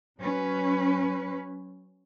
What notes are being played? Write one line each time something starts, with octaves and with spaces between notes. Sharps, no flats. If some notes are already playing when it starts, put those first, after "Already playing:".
F#3 C#4 B4